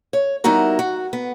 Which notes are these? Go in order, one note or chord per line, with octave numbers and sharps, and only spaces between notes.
C#5
G3 B3 D#4 E4 F#4 A#4
F#4
B3